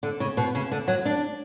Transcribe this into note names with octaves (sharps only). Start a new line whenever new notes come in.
D3
C#3
B2
C#3
D3
F#3
D4